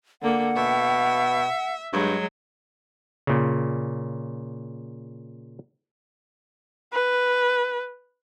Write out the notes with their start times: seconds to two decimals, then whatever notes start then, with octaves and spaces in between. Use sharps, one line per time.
0.22 D3 A#3 F#5
0.56 B2 E5
1.93 G2 F#3 G#3
3.27 A#2 C#3
6.92 B4